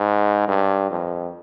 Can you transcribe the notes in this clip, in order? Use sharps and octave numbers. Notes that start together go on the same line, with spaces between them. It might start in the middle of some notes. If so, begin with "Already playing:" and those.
Already playing: G#2
G2
F2